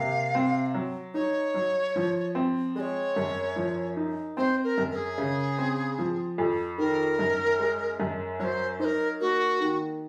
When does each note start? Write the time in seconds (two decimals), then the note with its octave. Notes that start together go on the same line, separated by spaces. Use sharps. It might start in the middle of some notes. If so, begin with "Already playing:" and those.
Already playing: C3 A#3 F5
0.35 C4
0.74 F#3
1.14 D#4 C#5
1.54 F#3
1.96 F3
2.35 C4
2.75 G#3 D#5
2.80 C#5
3.16 F#2
3.56 F3
3.96 D#4
4.37 C4 C5
4.64 A#4
4.78 F#2
4.91 A#4
4.95 G#4
5.18 C#3
5.58 C4
5.99 F3
6.38 F2
6.78 D#3 A#4
7.19 F#2
7.59 G#3
8.00 F#2
8.39 F#3 C5 C#5
8.79 D#4 C5
8.84 A#4
9.20 A#3 F#4
9.60 D#3